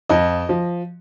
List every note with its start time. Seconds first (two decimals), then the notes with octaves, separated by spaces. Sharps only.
0.09 F2 D#5
0.49 F3